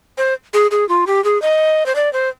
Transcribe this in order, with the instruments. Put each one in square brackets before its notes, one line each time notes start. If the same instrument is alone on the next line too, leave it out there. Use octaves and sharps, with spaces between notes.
[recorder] C5
G#4
G#4
F4
G4
G#4
D#5
C5
D5
C5